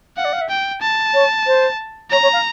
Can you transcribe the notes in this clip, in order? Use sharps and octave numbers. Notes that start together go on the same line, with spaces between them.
F5 F#5
D5
F5
E5
G5
A5
C#5
C5
C#5 A#5
C#5
F5